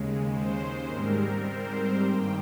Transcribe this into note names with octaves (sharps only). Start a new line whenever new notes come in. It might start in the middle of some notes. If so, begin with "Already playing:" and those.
Already playing: D#2 C#3 G#3
C5
G#2 G3 C4 A#4
C5
G2 D#3 A#3 G5